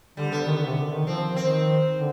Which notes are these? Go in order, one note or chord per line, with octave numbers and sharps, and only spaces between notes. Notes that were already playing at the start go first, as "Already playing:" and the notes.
D3 G3
D3 B3
D#3
D3
C3
D3
D#3
F3 C4
D#3 C4
D3